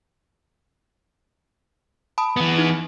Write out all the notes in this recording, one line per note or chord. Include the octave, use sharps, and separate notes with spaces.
A5 B5 D#6
E3 B3
D#4